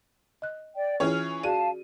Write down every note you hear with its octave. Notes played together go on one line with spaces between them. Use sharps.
D#5 F#6
D5 G5
E3 C#4 F4 G#4 C#5 F6
F#4 G#4 D5 F5 A5 D#7